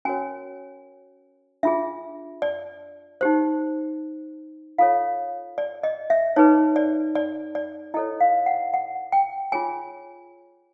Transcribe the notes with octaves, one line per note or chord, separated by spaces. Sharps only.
C#4 F#4 A#4 C#5 G#5
D4 F4 G#4 E5
D5
D#4 G4 C5
F4 A4 C#5 F5
D5
D#5
E5
D#4 G#4 B4 C#5
D5
D5
D5
E4 A4 C#5 D#5
F5
F#5
F#5
G5
F4 G#4 C#5 G#5